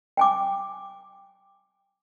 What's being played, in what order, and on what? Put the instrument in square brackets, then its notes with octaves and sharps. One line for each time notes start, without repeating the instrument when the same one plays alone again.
[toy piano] G5 G#5 D6